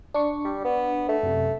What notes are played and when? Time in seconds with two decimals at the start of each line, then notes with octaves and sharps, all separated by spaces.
0.14 D4 C#6
0.45 G3
0.65 B3
1.09 A3
1.23 F#2 C3